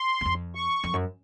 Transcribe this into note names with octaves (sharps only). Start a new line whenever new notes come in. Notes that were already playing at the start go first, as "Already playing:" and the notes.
Already playing: C6
E2
F2
C#6
F2
F#2